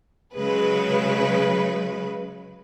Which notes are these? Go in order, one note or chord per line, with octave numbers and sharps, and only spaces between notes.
C#3 F#3 G#3 B4